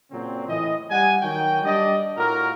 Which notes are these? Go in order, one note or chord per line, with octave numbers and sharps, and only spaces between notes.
A#2 C#3 F#3 C4
A2 E3 D#5
G3 F#5 G#5
D#3 F#3 F#4 G5
G3 D4 D5 D#5
A2 F4 F#4 A#4